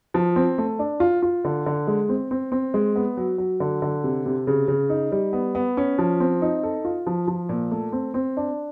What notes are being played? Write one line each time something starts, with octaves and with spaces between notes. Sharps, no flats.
F3
C4
A3
D4
F4
F4
D3
D3
G#3
C4
C4
C4
G#3
B3
F#3
F#3
D3
D3
C3
C3
C#3
C#3
D#4
G3
B3
B3
C#4
F3
C4
D#4
A4
F4
F3
F3
A#2
A3
C4
C4
D4